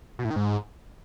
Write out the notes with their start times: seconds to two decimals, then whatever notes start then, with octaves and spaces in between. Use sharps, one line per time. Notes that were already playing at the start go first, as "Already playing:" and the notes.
0.19 B2
0.25 A2
0.30 D#3
0.36 G#2